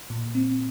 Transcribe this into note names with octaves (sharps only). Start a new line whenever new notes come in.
A#2
C4